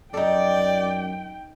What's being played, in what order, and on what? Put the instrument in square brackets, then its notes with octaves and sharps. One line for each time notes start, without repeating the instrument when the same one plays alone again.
[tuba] F#2 [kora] D#4 A4 [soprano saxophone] D5 [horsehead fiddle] G5